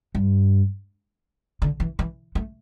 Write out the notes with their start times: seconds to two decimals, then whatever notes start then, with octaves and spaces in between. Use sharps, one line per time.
0.15 G2
1.62 D3
1.80 E3
1.99 E3
2.35 A3